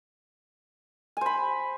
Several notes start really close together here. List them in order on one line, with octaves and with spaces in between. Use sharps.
G#5 C5 B5